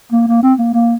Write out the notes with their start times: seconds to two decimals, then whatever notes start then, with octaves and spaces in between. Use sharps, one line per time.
0.12 A#3
0.27 A#3
0.42 C4
0.58 A#3
0.73 A#3